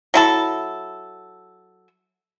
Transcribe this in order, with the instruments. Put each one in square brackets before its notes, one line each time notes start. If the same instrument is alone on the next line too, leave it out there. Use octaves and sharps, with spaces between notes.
[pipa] F#3 E4 A4